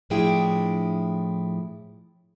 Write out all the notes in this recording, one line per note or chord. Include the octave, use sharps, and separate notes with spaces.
A2 F3 D4 E4 G#4 G5